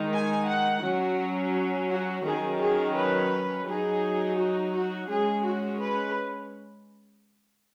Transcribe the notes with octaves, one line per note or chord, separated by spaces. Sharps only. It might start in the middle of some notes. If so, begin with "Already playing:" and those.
Already playing: D#3 G#3 D#4
G#5
F#5
F#3 C#4 F#4
F#4
D#3 F#3 C#4 G#4
G#4
B4
F#3 D#4 G#4
F#4
F#4
G#3 C#4 G#4
F#4
B4